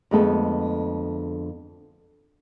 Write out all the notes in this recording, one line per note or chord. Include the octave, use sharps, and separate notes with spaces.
F2 D3 G#3 A3 B3 A4